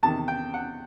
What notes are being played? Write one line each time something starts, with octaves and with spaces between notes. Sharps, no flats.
E2 C3 D#3 A5
G5
F#5